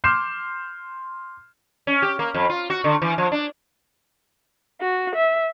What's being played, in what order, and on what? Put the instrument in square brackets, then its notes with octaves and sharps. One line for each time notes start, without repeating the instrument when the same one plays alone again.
[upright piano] C6 D6 F6 G6 C7 E7
[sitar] C#4
G4
A#3
F2
F4
F#4
D3
E3
F3
D4
[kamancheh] F#4
E5